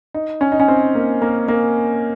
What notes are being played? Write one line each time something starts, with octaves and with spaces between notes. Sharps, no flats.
D#4
C#4
D#4
C#4
C4
A#3
A#3
A#3